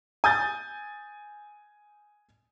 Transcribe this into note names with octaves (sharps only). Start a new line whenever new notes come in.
G#5 D#6 G6 A6